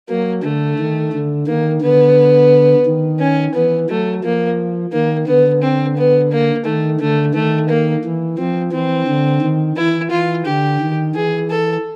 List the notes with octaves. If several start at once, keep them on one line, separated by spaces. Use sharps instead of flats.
F#3 A#3
D3 A3
D#3
D3
D#3 A#3
D3 B3
D#3
C#4
E3 B3
F#3 A3
F3 A#3
D#3 A#3
D3 B3
C4
B3
A#3
D#3 A3
D3 A3
D#3 A3
A#3
E3
F3 C4
E3 C4
D3
D#3
E3 E4
E3 F4
D3 G4
D#3
E3 G#4
A4